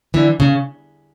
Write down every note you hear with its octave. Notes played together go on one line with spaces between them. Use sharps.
D3 E3
C#3